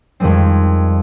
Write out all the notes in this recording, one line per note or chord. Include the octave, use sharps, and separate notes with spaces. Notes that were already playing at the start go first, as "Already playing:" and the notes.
F2 D#3 G3 G#3 C4